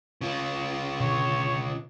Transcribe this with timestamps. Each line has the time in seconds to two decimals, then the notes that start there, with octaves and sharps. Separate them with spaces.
0.21 C#3 F4
1.00 B2 D3 C#5